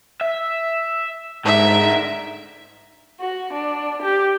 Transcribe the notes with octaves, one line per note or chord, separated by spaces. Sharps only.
E5
G#2 D3 A#4 E5
F#4
D4
G4